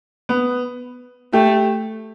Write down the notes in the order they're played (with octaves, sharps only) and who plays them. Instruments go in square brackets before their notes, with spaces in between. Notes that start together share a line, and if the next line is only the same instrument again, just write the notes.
[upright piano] B3
[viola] A3 [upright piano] G4